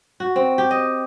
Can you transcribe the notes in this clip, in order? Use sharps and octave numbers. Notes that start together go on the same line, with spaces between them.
F#4
C4
G4
D#5